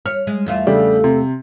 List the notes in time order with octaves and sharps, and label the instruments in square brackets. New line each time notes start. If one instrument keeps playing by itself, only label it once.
[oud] C#5 [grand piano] F6
[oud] G#3
E2 A3 F4
[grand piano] C#3 G3 D4 [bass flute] A4
[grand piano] C3